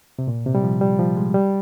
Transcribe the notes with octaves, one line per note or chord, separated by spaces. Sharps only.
C3
A#2
C3
G3
F3
G3
F3
G#3
G3